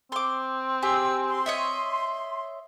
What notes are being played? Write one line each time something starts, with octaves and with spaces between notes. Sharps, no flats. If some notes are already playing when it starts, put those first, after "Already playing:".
C4 C6 D6
G4 G#4 E6
C6
C#5 D#5 E5